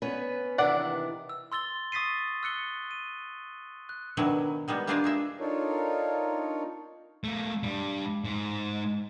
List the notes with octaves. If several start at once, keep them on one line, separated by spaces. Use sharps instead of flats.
B3 C#4 B4
C3 D#3 E3 D4 D5 F#5
E6
C6 E6 A6 G7
C#6 D#6 A6 B6 C7 D#7
E6 F#6 C#7 G7
D#7
F#6
B2 D3 D#3 F#3 E4
D#3 G3 G#3 B3
G3 A#3 D4 F4 G#4 D5
G#3 G#4 E5
D4 D#4 F4 A4 A#4 C#5
A3 A#3
G2 G3
G#2